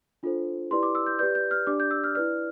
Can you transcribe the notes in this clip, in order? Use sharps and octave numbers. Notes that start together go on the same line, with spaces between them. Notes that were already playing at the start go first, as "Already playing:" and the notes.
D4 F4 A4 C5
E4 G4 B4 D5 C6
D6
E6
G6
G4 B4 D5 G6
G6
F6
D4 G4 D5 D6
G6
E6
F6
E4 B4 D5 F6